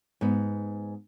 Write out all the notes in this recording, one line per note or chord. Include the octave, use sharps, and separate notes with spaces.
G#2 B3